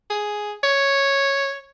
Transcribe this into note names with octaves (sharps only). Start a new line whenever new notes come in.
G#4
C#5